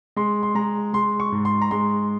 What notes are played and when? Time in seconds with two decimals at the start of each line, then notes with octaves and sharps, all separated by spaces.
0.16 G#3 C6
0.43 C6
0.55 G#3 A#5
0.93 G#3 C6
1.20 C#6
1.32 G#2
1.45 C6
1.62 A#5
1.71 G#3 C6